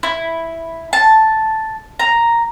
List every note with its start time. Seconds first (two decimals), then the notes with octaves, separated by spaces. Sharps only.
0.03 E4
0.93 A5
1.99 A#5